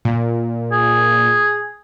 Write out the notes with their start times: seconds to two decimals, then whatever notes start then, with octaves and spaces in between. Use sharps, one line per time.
0.05 A#2
0.72 G#4